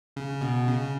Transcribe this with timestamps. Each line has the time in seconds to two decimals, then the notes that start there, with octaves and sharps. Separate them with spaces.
0.16 C#3
0.41 B2
0.67 C#3